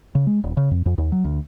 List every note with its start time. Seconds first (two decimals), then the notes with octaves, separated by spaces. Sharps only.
0.15 C#3
0.27 G#3
0.44 D#1
0.57 C#3
0.71 F2
0.86 F2
0.98 D#2
1.12 F#3
1.25 D2